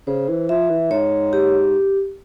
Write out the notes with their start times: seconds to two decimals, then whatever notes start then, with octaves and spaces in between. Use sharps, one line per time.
0.07 C#3 C5
0.29 E3
0.49 F3 E5
0.70 E3
0.91 G#2 C#5
1.33 G4